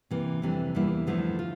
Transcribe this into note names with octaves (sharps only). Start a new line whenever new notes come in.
C3 E3 A#3
F2 C3 E3 G3 D4
E2 E3 G3 A#3 E4
E2 D3 F3 A3 E4
F4